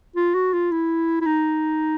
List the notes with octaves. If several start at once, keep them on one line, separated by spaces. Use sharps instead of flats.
F4
F#4
F4
E4
E4
D#4